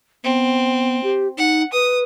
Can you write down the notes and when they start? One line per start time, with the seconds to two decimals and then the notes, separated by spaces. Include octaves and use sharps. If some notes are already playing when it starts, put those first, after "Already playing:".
0.24 B3 C4
1.03 G4
1.37 D#4 F#5
1.73 B4 D#6